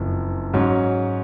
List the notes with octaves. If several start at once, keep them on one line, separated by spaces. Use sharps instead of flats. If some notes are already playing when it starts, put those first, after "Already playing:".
Already playing: F#1 F2 F3
G#2 F#3 C#4